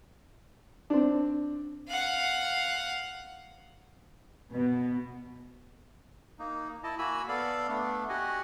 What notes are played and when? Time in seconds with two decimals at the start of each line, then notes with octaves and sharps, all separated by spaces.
0.90 C4 D4
1.89 F5 F#5
4.52 B2
6.39 A#3 D#4
6.84 E4 D#5 A5
6.98 A#3 F#4 G#5 B5 E6
7.28 B3 A4 D5 F5
7.68 A3 B3 D4
8.09 F#4 G4 D#5 F#5 G#5